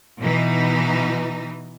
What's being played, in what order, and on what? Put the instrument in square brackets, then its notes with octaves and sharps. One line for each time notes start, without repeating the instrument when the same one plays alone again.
[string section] B2 E3 D#4